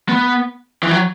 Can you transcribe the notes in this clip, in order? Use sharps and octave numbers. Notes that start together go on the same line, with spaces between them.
B3
E3
F#3